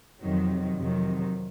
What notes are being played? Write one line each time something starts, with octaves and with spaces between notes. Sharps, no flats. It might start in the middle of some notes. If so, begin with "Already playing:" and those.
F2 C3 D#3 F#3
F2 C3 D#3 F#3